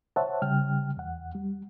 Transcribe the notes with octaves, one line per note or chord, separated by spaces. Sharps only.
C5 C#5 E5 F#5 A5
C#3 G3 G5 F6
E2 F#5
G3